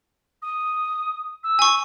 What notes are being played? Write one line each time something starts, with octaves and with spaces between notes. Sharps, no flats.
D#6
E6
G#5 C#6